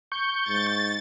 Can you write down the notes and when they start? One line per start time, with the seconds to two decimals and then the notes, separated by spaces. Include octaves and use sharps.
0.12 C#6 G6
0.49 G#2 A6